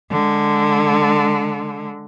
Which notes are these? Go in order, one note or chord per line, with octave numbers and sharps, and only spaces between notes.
D3 G#3